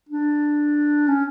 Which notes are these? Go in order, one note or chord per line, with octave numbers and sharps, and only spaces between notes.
D4
C#4